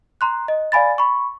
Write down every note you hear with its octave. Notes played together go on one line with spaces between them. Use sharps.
A#5 C6 F#6
D#5
D5 F5 G#5 B5 A6
B5 C#6